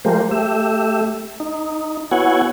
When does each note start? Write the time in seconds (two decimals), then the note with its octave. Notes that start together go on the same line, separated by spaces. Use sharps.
0.05 F3 G#3 A3 G4 A#4 C5
0.31 A3 G4 E5
1.40 D#4
2.11 B3 E4 F#4 C#5 F#5 G#5